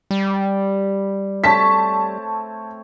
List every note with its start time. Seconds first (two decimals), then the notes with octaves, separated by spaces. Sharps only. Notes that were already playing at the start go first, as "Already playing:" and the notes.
0.11 G3
1.44 A3 C4 C#5 A5 B6